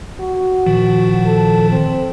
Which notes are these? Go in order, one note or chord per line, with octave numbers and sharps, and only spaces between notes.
F#4
A#2 D#3 F3
A4
C4